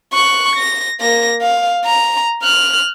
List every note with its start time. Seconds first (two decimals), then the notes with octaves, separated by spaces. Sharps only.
0.13 C#6 F#6
0.56 A#6
1.00 A#3 A#6
1.42 F5
1.85 A#5
2.43 F6 F#6